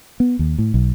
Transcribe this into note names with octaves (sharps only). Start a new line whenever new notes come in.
B3
D#2
A2
B1